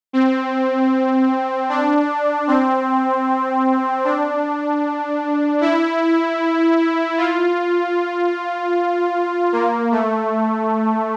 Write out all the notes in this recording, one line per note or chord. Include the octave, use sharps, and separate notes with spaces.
C4
D4
C4
D4
E4
F4
A#3
A3